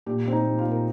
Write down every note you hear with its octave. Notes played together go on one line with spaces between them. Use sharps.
A#2 G4
A#2 C4
D#4
A#2
F4
A#2
A#4